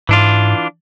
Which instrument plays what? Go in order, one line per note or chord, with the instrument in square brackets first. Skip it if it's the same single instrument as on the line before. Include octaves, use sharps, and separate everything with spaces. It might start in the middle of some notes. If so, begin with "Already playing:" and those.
[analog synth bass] G#2 [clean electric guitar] E3 D4 F4